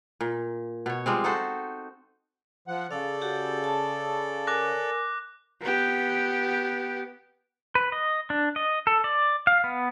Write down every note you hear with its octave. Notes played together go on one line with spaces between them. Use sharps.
A#2
B2 C#5
F3 G3 G#3 C4
D#4 F#4 A4 C5
F3 F#5
C#3 A4 D5 F5
F#4 G4 F#5
A5
A#4 G#5 D6 F#6 A#6
B3 G4
B4
D#5
D4
D#5
A4
D5
F5
B3